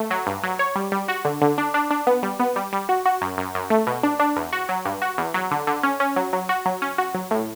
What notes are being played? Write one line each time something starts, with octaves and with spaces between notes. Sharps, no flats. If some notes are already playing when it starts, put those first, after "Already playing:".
Already playing: A3
F#3
G2
F#3
C#5
G3
G3
F#4
D3
D3
D4
D4
D4
B3
G3
B3
G3
G3
F#4
F#4
F#2
F#2
F#2
A3
B2
D4
D4
E2
F#4
F#3
G2
F#4
E2
F#3
D3
D3
C#4
C#4
F#3
F#3
F#4
F#3
C#4
F#4
F#3
A2